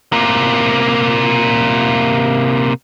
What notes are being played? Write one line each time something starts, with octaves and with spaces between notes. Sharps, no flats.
C3 A#3